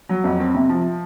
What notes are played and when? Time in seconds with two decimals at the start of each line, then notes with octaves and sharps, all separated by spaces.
0.09 F#3
0.24 F2
0.39 C4
0.55 C3
0.69 F3